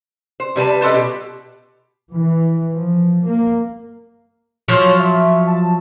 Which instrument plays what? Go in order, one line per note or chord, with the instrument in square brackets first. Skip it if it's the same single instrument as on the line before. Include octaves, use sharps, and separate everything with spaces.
[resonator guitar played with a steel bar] C5
C3 G3 B4 A5
F4 G4 A4 B4 D#5
B2 G4
[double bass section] E3
F3
A#3
[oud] F3 F#3 [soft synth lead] C#5
[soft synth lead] E5
A5